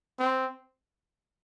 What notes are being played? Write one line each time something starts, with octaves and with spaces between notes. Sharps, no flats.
C4